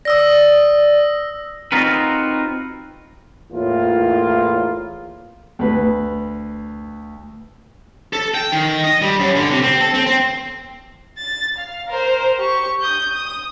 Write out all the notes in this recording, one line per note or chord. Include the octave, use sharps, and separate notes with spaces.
D5 D#6 E6 A#6
C4 D#4 F4 F#4 A#4 B4
E2 A2 A#3 F4
D2 B4
A4
G5
D#3
D#5
G3
F#2
D3
C3
C4
A4
C4
C4
A6
F5
A#4 C5
G4 C#6
D#6 G6
D#6